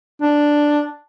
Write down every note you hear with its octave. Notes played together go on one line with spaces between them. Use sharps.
D4